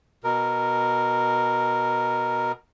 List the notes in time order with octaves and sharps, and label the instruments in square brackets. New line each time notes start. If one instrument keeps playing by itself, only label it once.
[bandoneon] B2 A#4